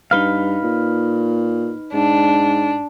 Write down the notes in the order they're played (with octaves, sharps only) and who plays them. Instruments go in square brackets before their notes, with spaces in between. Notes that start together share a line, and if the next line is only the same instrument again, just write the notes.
[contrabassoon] G2 [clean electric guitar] D#4 B4 F5
[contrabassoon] A#2
[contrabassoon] G#2 [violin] D4